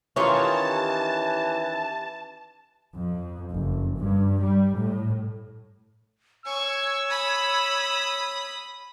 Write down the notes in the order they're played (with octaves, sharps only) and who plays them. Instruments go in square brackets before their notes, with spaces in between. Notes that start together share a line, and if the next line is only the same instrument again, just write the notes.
[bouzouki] D#3 G4 C#5 [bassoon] E3 [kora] C#4 F4 [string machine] A5
[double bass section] F2
F#1
G2
G3
A2
[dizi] C#5 [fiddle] G#5 C#6 [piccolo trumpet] E6
[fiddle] B5 D#6